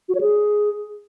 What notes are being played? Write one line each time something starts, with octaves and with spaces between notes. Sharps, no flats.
F#4
C#5
G#4